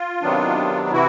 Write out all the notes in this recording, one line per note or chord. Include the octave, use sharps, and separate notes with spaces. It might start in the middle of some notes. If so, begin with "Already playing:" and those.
Already playing: F4
C3 D#3 F#3 B3 D4
C3 E3 E4 F#4